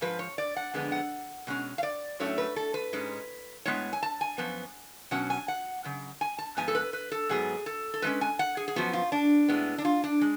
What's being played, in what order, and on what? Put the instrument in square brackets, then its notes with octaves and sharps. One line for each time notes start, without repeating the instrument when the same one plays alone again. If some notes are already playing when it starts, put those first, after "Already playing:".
[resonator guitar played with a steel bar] G#2 F3 B4
C#5
D5
F#5
F2 D3 G#3 B3
F#5
B2 G#3 C#4
F5
D5
A2 F#3 A3 C#4 C#5
B4
A4
B4
G#2 G#3 C#4
A2 G#3 B3 C#5
G#5
A5
G#5
F#2 F3 B3
B2 F#3 C#4 F#5
G#5
F#5
F#2 C#3
G#5
A5
G#2 F3 B3 G#5
A4
B4
B4
A4
G#2 F#3 B3 G#4
A4
A4
A2 G#3 C#4 B4
G#5
F#5
G#4
G#4
F#2 F3 B3 F#4
F4
D4
A2 G#3 B3
D4
F4
D4
G#3